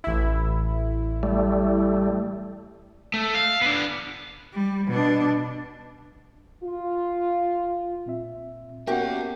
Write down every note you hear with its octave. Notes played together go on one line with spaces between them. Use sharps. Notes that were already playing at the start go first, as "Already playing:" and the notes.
A1 E4
G3 A3
A3
F5
B3 D4
G3
B2 D4
F4
A#2 C4 E5
A#3 B3 C#4 F#4 G4 E5 F#5 G5